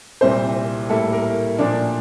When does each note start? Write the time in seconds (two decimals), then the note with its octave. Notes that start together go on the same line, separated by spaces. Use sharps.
0.21 C2 A#2 G3 C4 E4 C5
0.89 A2 G3 A#3 E4 A4
1.12 A#4
1.58 A#2 F3 A#3 D4 D5